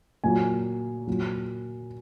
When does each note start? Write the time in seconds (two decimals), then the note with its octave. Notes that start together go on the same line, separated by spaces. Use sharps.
0.24 A#2 F#3 G#5
1.07 A#2 F#3